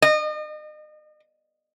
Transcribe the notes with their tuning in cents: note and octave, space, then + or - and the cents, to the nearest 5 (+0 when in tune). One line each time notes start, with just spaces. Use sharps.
D#5 -35